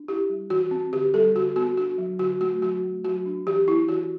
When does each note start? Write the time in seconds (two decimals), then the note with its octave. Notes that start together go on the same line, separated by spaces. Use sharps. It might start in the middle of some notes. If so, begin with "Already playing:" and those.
Already playing: D4
0.08 E4 G4
0.30 G3
0.50 E3 F#4
0.71 C4
0.93 D3 G4
1.14 G3 A4
1.36 D3 F#4
1.56 B3 F#4
1.77 D4 F#4
1.98 F#3
2.19 D3 F#4
2.40 A3 F#4
2.62 F#3 F#4
2.83 A3
3.04 F#3 F#4
3.26 D4
3.47 E3 G4
3.67 B3 E4
3.88 E3 F#4